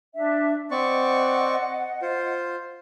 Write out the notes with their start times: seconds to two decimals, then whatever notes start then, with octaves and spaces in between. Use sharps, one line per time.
0.14 D4 E5
0.71 C4 D5 D#5 F#5 C#6
2.02 F4 C5